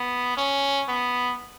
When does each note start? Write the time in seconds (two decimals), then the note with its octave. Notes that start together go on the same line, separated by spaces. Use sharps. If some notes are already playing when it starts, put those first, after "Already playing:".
Already playing: B3
0.37 C#4
0.88 B3